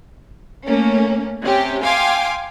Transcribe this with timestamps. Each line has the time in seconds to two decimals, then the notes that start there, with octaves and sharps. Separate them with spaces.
0.65 A3 A#3 C#4
1.41 C3 C#4 G4
1.84 F5 G5 G#5 C6 D6